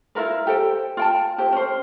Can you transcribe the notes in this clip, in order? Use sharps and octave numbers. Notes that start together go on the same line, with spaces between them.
E4 F4 A#4 B4
G4 A4 C5 G5
F4 G5 A5
E4 G4 C5
C#4 C5